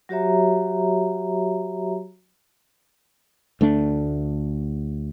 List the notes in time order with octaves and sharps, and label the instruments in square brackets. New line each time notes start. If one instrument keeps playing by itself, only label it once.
[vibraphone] F#3 F#4 G4 C#5 E5 A#5
[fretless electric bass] D2 A3 D4